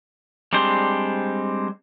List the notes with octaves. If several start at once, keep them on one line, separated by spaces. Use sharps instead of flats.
G3 G#3 C4 D4 C5